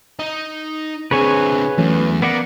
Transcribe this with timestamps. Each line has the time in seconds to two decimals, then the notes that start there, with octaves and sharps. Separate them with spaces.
0.19 D#4
1.11 D3 C4 G#4 B4 C#5 G#5 C#6
1.78 E2 F#3 A3 C#4
2.22 A#3 B3 D5 F#5